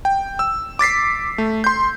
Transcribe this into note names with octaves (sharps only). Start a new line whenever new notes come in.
G5
E6
D6 A6 B6 C7
A3
C6 G6